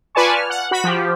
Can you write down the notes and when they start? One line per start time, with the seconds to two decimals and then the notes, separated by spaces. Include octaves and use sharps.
0.15 F4 B4 D5 G#5 A5 C#6
0.34 F6
0.50 F#5
0.71 F#4 B5 B6
0.84 F3 G4